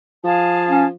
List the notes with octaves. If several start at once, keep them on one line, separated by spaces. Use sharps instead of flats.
F3 G#4 F5 A5
C#4